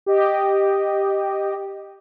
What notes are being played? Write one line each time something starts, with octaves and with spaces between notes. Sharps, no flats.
G4 D#5